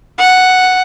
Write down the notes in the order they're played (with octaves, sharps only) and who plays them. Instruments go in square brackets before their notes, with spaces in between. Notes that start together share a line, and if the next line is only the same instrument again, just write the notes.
[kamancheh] F#5